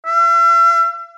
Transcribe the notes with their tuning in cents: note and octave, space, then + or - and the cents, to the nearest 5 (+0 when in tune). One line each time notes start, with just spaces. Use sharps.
E5 +45